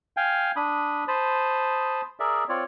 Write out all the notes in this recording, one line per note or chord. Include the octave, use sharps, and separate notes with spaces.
F5 G5 G#5
D4 B5 D#6
C5 A5 B5 D#6
G#4 A#4 D5 E5
C4 F4 C#5 D5